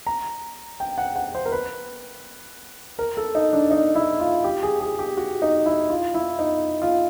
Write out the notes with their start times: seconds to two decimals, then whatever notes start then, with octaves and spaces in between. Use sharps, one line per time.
0.07 A#5
0.80 G5
0.98 F#5
1.16 F#5
1.35 C5
1.45 A#4
1.52 B4
2.99 A#4
3.17 A4
3.35 D#4
3.53 D4
3.71 D#4
3.95 E4
4.20 F4
4.44 G4
4.63 G#4
4.81 G#4
4.99 G4
5.17 F#4
5.42 D#4
5.66 E4
5.90 F4
6.14 E4
6.39 D#4
6.82 F4